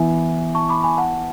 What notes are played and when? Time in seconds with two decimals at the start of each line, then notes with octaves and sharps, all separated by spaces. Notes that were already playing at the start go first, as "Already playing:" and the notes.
Already playing: E3 B3 E4 E5 G#5
0.55 A5 C#6
0.69 B5 D6
0.83 G#5 B5
0.97 F#5 A5